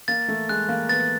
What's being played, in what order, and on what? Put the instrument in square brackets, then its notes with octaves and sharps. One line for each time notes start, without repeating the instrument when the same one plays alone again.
[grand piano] A#3 [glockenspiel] A6
[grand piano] A3
[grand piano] G#3 [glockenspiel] F#6
[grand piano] A#3
[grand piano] B3 [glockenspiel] A6